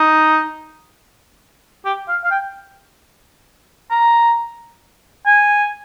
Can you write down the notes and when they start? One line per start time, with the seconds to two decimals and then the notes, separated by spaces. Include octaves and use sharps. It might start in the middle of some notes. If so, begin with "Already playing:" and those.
Already playing: D#4
1.85 G4
2.08 F5
2.24 F5
2.31 G5
3.91 A#5
5.26 G#5